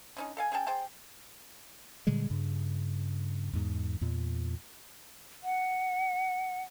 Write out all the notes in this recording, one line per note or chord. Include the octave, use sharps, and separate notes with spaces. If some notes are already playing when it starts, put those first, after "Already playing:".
D3 C#4 D#4
A4 F5 G#5
C#4 G#4 G5 A5
G#4 C5 G5 A5
A#2 D3 G3 G#3
G2 C#3
E2 G#2
E2 A#2
F#5